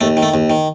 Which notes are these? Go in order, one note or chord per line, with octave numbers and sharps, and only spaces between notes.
D#2 A3
D#3
A3
D#2
D#3